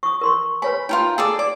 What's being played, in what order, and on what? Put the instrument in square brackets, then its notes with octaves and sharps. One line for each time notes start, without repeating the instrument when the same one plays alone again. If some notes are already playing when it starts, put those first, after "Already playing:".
[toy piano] C#6 D#6
A#4 C6 C#6
[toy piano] B4 C#5 G#5 [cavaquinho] B5
[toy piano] D#4 [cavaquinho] F4 A#4 G5
[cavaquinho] G#4 A4 D5
[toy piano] D5 [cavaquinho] D6